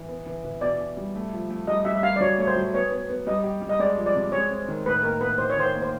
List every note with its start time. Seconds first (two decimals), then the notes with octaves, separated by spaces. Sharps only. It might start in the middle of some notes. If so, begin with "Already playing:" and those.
Already playing: E3
0.09 B3
0.26 E3
0.44 E3
0.61 B2 D5
0.79 B2
0.97 G3
1.15 A3
1.33 F3
1.50 A3
1.67 G3 D#5
1.85 G3 E5
1.96 E5
2.03 G3 F5
2.16 D5
2.21 F#3 C#5
2.38 A3 C#5
2.47 C5
2.56 F#3
2.74 B3 C#5
2.91 B3
3.09 B3
3.27 G3 D#5
3.44 G4
3.62 G3
3.69 D#5
3.79 G#3 D5
3.97 F3
4.06 D5
4.15 C3
4.32 G#3 C#5
4.50 C4
4.68 D#3
4.86 A2 B4
5.03 A#3 A#4
5.21 A2 B4
5.38 D#3 C5
5.50 C#5
5.56 D#3 C5
5.74 A#3
5.82 C5